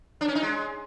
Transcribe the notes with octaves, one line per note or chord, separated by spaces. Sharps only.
D4
C#4
D#4
G#3